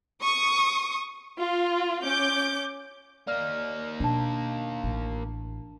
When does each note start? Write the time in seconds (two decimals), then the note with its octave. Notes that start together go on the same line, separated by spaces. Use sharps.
0.22 C#6 D#6
1.37 F4
2.03 C#4 D6 G6
3.27 A#3 D#4 D5 F6
4.00 B2 D4 A5
4.84 A1